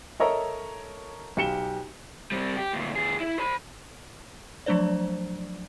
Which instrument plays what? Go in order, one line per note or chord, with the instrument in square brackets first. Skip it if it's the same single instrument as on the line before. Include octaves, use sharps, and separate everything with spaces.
[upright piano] A4 A#4 C#5 D#5 E5 A#5
B1 G4 C#7 E7 G7
[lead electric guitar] G3 C4
G4
D2 A#2
D#2 G#4
E4
C5 B5
[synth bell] F3 F#3 A3 D4 C5 D5